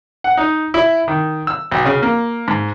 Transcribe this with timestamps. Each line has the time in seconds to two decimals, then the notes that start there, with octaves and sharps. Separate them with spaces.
0.24 F#5
0.37 D#4
0.74 E4
1.08 D#3
1.47 E6
1.71 B1
1.85 C#3
2.02 A#3
2.48 G#2